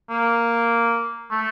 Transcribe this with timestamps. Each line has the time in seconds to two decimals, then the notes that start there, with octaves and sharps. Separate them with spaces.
0.10 A#3
1.31 A3